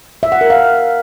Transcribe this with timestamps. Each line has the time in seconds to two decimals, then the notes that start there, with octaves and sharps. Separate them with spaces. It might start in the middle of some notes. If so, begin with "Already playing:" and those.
0.23 E5
0.32 F#5
0.41 A#4
0.50 F5